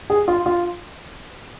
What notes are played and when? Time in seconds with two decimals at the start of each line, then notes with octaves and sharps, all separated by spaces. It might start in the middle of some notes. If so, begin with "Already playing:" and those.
0.10 G#4
0.28 F4
0.46 F4